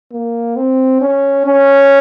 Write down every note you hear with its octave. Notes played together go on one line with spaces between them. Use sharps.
A#3
C4
C#4
C#4